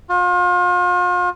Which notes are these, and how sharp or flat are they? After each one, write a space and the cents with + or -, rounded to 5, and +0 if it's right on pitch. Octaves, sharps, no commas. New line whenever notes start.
F4 +40